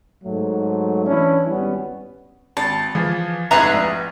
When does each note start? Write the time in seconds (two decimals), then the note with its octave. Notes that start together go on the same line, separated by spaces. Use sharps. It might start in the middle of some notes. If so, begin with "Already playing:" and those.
0.25 G#2 F#3 A3
1.07 E3 C#4 D4 E4
1.48 G#1 G3 B3 C#4
2.57 G#1 A5
2.95 E3 F3 G#4
3.51 F1 G#2 B3 E4 G#4 E5 A#5 F#6
3.74 A#1